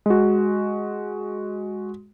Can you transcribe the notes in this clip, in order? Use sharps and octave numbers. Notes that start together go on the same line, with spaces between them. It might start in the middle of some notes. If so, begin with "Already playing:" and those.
G#3 F#4